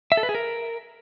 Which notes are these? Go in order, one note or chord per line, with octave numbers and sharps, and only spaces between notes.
E5
A4
B4
G#4
A#4